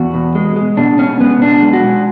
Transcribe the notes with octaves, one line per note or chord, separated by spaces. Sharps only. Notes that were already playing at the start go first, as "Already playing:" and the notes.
Already playing: E2 F#4
B2
G#3
G#3
B2 D4
B2 C#4
G#3 B3
B2 D4
G#3
F#4
G#3